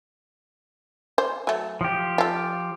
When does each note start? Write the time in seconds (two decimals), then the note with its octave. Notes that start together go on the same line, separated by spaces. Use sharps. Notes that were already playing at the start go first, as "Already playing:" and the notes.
1.18 C5
1.47 F#3 A3
1.81 F3 G4
2.18 F4 A4